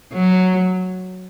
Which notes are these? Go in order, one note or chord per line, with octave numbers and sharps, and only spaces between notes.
F#3